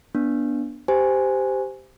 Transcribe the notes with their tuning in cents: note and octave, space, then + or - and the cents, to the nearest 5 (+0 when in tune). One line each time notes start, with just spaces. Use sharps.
B3 -20 D4 -5
G4 -5 C5 -15 G#5 +0